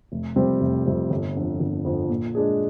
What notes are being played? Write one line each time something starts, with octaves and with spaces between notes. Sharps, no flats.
F1
F2 C3 G3 C4
F1
F2 C3 G3 C4
G1
F2 D3 F3
G1
F2 D3 F3
A#2
G#3 D4 G#4